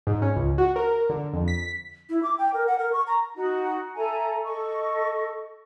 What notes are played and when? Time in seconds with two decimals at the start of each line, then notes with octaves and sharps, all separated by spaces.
0.07 G#2
0.22 C#4
0.36 C#2
0.58 F#4
0.76 A#4
1.09 D3
1.33 F2
1.48 B6
2.10 E4
2.23 D6
2.38 G5
2.54 A#4
2.67 F#5
2.79 A#4
2.93 C#6
3.07 A#5
3.35 D#4 F#4
3.96 A4 E5 G#5 A#5
4.44 A4 D#5 C#6